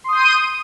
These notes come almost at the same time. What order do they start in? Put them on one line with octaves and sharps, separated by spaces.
C6 D#6 G6 D#7